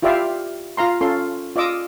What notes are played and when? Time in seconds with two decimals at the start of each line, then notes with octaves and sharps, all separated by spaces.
0.02 E4 F4 G4 D5 E5 F5
0.77 F4 F5 A#5 C6
1.01 C#4 F4 A4 C6
1.56 F4 D5 D#5 D6 E6